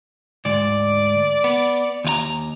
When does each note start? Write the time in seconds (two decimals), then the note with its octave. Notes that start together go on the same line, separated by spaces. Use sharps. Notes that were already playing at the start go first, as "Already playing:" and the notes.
0.45 D2 G#2 D5
1.44 B3
2.04 D#2 F4 A#5